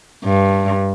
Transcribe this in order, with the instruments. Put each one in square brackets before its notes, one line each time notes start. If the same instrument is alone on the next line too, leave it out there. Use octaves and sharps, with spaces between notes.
[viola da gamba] G2